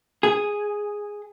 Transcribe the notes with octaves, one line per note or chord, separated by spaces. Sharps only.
G#4